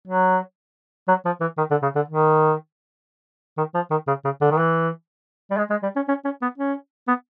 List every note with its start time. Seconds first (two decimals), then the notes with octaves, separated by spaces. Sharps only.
0.08 F#3
1.08 F#3
1.25 F3
1.41 E3
1.58 D#3
1.71 D3
1.82 C#3
1.95 D3
2.08 D#3
3.58 D#3
3.75 F3
3.91 D#3
4.07 C#3
4.25 C#3
4.41 D3
4.51 D#3
4.59 E3
5.51 G3
5.57 G#3
5.70 G#3
5.83 G3
5.96 C#4
6.08 C#4
6.25 C#4
6.42 B3
6.58 C#4
7.08 B3